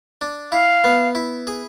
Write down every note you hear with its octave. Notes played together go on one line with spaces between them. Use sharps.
D4
E4 F5
B3
E4
G#4